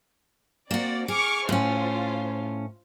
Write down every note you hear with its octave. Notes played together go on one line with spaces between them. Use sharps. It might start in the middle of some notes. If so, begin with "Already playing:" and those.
A#3 C4 F#4 D5
G#4 C#6 D6 F6
A2 C#4 F4 C5